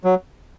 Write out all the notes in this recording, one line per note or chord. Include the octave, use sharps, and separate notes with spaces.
F#3